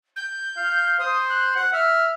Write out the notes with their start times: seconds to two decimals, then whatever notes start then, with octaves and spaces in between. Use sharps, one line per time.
0.16 G6
0.57 F5
0.99 C5 D#6
1.30 F#6
1.55 F#5
1.73 E5 F6